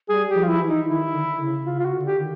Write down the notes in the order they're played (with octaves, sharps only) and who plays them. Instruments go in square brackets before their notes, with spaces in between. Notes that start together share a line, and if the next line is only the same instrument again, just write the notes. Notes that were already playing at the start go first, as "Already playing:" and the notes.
[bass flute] G3 [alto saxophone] G#4
[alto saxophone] G4
[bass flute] F3
[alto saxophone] F4
E4
[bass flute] E3
[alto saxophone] D#4
[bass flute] D#3 [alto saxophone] E4
[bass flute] D3
C#3
[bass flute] C#3 [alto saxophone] F4
[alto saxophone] F4
F#4
[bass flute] D3
[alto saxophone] G4
[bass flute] D#3